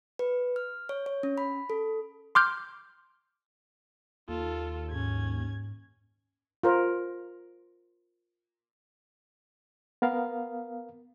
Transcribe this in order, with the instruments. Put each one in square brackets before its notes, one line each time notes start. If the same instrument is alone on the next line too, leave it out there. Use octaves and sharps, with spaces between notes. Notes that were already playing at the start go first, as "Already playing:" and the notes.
[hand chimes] B4
F6
C#5
C#5
C#4
B5
A4
[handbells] C6 D6 F6 G6
[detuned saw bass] D#2 [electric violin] F4 A4
[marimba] G#2 [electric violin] C#4 G#6
[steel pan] F4 A#4 C5
[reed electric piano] B3 A#4 F5